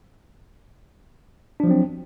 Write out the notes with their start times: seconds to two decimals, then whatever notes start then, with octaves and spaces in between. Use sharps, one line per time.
1.60 D4
1.63 F3
1.67 F#3
1.71 C4